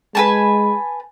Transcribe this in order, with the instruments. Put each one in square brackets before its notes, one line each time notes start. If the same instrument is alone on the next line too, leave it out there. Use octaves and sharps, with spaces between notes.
[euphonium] G#3 [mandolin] B4 G#5 A5